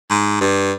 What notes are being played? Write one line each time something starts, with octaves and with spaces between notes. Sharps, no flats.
G#2
G2